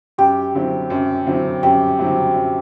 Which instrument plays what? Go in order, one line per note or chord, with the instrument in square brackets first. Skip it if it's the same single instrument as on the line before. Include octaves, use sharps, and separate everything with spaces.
[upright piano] F#2 [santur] G4
[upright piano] D3 F#3 C4 E4
F#2
D3 F#3 C4 E4
[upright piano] F#2 [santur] G4
[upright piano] D3 F#3 C4 E4
F#2